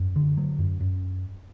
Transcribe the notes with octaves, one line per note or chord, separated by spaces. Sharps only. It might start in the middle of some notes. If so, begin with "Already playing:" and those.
Already playing: F#2
D3
F#3
F#2
F#2